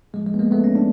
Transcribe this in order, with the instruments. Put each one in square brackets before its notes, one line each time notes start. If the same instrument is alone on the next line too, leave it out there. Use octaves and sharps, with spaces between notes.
[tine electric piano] A2 F3 G#3
G#3
B3
G#3 A#3
A3 B3
C#4
D4